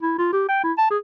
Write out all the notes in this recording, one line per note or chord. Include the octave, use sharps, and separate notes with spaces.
E4
F4
G4
G5
E4
A5
G#4